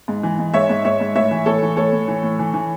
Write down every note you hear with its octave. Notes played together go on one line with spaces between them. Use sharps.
G#2
E3
G#2
G#2 C#5 E5
G#2
G#2 C#5 E5
G#2
A2 C#5 E5
E3
A2 A4 C#5
E3
A2 A4 C#5
A2
E3
A2
E3
E3